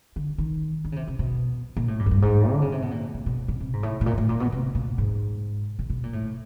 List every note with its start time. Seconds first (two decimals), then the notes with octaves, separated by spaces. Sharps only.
0.16 D3
0.38 D#3
0.85 D3
0.92 C#3
0.96 C3
1.08 C3
1.19 B2
1.77 A#2
1.88 A2
1.99 G2
2.06 F#2
2.11 G2
2.22 G#2
2.52 D3
2.62 C#3
2.72 C3
2.82 B2
2.91 A#2
3.14 A2
3.26 B2
3.48 B2
3.60 C3
3.73 G#2
3.83 A2
4.01 A2
4.06 A#2
4.18 A2
4.29 A#2
4.40 B2
4.52 C3
4.75 A#2
4.98 G#2
5.79 A#2
5.90 B2
6.03 A#2
6.13 A2